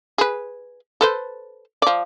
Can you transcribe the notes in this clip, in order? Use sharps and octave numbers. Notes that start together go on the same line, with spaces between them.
G#4 B4
A4 B4 C5
F3 D5